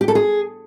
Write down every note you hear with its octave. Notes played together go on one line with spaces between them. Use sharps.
G4
A4
G#4